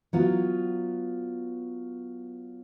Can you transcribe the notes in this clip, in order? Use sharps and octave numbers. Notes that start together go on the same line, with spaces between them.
F#3 B3 F4